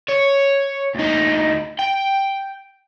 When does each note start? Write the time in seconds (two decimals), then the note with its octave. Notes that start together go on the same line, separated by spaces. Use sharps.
0.09 C#5
0.95 D2 D#4
1.79 G5